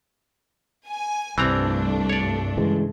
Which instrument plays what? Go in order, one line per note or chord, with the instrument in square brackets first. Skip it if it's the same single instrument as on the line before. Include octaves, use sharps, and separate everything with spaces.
[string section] G#5
[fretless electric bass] C2 C3 [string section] G2 A3 D4 [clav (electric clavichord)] E3 C4 A#5
[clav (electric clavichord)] C#5 D5
[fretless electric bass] C#3 E3 G#3